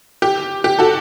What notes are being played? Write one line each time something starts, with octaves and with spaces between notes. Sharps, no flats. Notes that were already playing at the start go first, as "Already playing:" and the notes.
G4
G4
F#4 A4